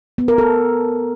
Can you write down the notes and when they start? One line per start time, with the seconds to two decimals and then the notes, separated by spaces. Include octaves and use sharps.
0.18 B3
0.28 A#4
0.38 A4